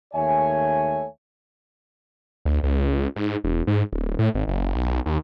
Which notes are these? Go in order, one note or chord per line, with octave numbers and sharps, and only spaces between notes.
D#2 A3 C#5 E5 G#5
D2
C#2
G#2
E1
G#2
D1
A2
G#1
F#1
B1
D#2